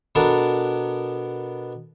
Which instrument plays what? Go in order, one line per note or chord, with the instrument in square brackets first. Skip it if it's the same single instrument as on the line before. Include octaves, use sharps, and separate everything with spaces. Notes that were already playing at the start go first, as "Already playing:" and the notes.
[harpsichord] B2 B3 D4 A4 A#4